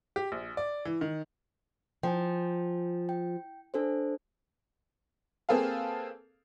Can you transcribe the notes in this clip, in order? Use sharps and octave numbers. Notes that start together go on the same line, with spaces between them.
G4
A#1
D5
E3
D#3
F3 G5 G#5
G5
D4 A4 C5
A#3 C4 G#4 A4 B4 F5